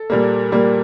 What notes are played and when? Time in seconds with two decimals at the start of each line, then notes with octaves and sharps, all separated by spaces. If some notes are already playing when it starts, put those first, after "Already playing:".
Already playing: A4
0.10 A#2 G3 A#3
0.52 A#2 G3 A#3